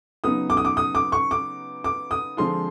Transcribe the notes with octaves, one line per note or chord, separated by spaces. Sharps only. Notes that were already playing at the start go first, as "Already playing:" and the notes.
C#3 F#3 B3 D#4 D#6
D6
D#6
D6
D#6
D6
C#6
D6
D6
D#6
D3 F3 G#3 C4 F4 C6